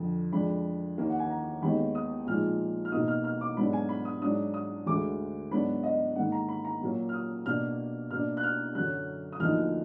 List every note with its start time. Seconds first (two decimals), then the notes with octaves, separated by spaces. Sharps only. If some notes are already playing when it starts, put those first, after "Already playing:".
Already playing: F2 D3 F3
0.32 F2 F3 G#3 D4 B5
0.98 D#2 D#3 A#3
1.09 F#5
1.19 G#5
1.30 A#5
1.62 D#2 D#3 G#3 B3 D#4 B5
1.95 D#6
2.27 A#2 F3 G#3 D#4 F6
2.85 F6
2.92 B2 A#3 D#4 D#6
3.08 F6
3.24 F6
3.41 D6
3.57 G#2 F#3 B3 D4 B5
3.73 G#5
3.89 B5
4.05 D#6
4.22 G#2 F#3 D4 D#6
4.54 D#6
4.86 D2 D3 G#3 D6
5.51 G#2 F#3 B3 D4 B5
5.83 D#5
6.16 G#2 D#3 A#3 F#5
6.32 A#5
6.48 B5
6.64 A#5
6.81 A#2 F#3 A#3
7.09 F6
7.13 D#6
7.46 B2 A#3 D4 F6
8.11 B2 A#3 D4 F6
8.37 F#6
8.43 F6
8.75 F#2 D3 F#3 F#6
9.32 D#6
9.40 D2 D3 F3 A#3 D#4 F6